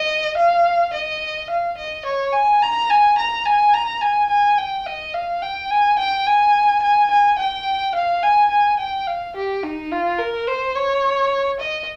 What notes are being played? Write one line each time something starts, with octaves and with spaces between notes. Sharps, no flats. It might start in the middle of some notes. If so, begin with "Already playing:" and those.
Already playing: D#5
F5
D#5
F5
D#5
C#5
G#5
A#5
G#5
A#5
G#5
A#5
G#5
G#5
G5
D#5
F5
G5
G#5
G5
G#5
G#5
G#5
G5
F5
G#5
G#5
G5
F5
G4
D#4
F4
A#4
C5
C#5
D#5